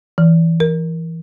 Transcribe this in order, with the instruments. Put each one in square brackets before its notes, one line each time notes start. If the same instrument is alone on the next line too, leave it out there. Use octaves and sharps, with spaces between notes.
[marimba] E3
A#4